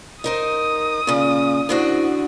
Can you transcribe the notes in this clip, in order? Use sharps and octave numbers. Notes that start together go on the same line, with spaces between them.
D#4 A#4 C5 D#6
A#2 C#3 C#4
D3 D4 E4 F#4 C5 C#6